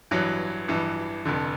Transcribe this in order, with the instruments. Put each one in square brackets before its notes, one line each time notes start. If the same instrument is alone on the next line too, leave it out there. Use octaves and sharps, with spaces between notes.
[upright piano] A1 G2 E3 F#3
A1 G2 E3
F1 F2 D3